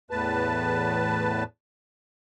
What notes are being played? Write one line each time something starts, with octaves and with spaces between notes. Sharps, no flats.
E2 A2 B4 A5